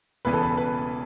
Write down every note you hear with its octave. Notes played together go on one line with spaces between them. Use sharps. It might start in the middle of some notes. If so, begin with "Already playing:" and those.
E1 E2 C#3 E3 B3 B4
A4
B4
B4